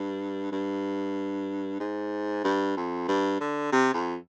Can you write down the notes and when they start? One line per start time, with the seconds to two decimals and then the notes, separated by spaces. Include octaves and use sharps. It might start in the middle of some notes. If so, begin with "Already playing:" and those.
Already playing: G2
0.52 G2
1.80 G#2
2.44 G2
2.77 F2
3.08 G2
3.40 D3
3.73 C3
3.94 F2